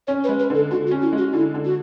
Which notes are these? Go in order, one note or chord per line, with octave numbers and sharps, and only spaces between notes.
C#4 C#5
B4
G#3
B4
D3 A4
D3 F#4
F#4
C#4
E4
G#3
F#4
D3 E4
D3
F#4